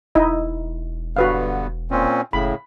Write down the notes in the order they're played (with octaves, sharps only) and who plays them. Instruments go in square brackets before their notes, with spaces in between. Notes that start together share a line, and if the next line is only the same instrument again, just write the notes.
[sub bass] E1 [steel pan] D#4 E4 D#5
[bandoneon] G2 D3 B3 [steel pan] F#4 B4 F5
[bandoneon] A#2 C4 C#4
[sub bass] F#1 [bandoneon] A2 C#3 [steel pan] B5